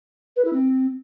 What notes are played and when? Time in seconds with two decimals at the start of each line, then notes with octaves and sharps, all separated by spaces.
0.36 B4
0.45 E4
0.53 C4